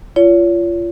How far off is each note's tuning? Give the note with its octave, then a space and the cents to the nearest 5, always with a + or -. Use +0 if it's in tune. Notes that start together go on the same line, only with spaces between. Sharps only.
F4 -25 C#5 +40